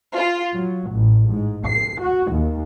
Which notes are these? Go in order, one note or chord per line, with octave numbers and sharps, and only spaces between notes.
F4
F#3
A1
G#2
C7
F#4
D#2